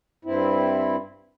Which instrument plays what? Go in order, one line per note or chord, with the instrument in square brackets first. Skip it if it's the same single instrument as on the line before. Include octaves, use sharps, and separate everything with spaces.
[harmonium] G2 C4 E4